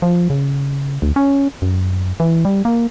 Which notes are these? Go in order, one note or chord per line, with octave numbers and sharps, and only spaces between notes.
F3
C#3
D2
C#4
F#2
E3
G3
A#3